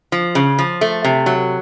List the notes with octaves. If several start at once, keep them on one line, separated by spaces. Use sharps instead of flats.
F3
C#3
F3
A3
C3
F#3